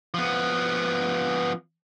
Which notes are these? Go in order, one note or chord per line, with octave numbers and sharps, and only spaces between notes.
F3 B3